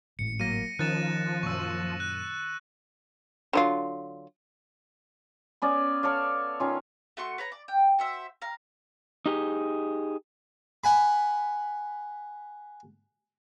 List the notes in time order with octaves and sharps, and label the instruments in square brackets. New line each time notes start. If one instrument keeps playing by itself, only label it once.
[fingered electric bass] G#1 A2 [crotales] C#7
[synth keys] F#3 A#3 [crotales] A#6 D#7
[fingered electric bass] D#3 [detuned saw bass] F3 [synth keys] C#4 D#4 A#4 [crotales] F#6 A6 E7
[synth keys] F#2 A#2 [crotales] C#6 E6
[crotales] F#6
[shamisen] D3 F#3 F4
[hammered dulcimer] B3 C#4 D5
A4 C#5 D5 F5
D#3 C#4 F4
[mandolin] A3 F#4 C6 C#6
B4 C#5 A#5
D5
G5
F#4 C5 E5
F5 A#5
[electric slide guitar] D#4 G4 G#4
[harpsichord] F#5 G#5 B5